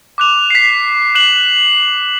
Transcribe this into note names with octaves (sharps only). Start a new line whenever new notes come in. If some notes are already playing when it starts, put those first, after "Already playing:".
D6 F#6 F7
B6 C7
F#6 E7 F#7